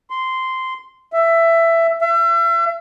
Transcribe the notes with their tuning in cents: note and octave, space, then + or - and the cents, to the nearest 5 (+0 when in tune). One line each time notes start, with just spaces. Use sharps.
C6 -10
E5 +15
E5 +40